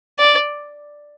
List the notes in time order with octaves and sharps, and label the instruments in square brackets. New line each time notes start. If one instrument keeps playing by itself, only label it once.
[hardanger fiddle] D5